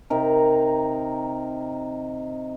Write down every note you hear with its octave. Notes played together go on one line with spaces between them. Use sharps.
C3 D#4 A#4